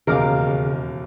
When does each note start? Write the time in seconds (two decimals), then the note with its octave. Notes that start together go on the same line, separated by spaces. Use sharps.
0.07 E1 D#2 C#3 A#4 F5 D6